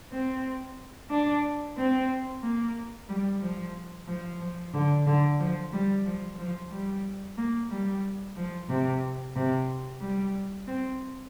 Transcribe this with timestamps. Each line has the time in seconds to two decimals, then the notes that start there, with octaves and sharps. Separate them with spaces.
0.11 C4
1.10 D4
1.77 C4
2.43 A#3
3.09 G3
3.41 F3
4.07 F3
4.40 F3
4.74 D3
5.07 D3
5.39 F3
5.73 G3
6.05 F3
6.38 F3
6.71 G3
7.37 A#3
7.70 G3
8.36 F3
8.69 C3
9.36 C3
10.01 G3
10.67 C4